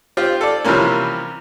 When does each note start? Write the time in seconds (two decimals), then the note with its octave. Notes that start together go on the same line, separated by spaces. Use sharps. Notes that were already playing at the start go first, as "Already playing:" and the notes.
0.17 C4 F4 G4
0.41 A4 D5
0.64 C3 E3 F3 G3 A#3 C#4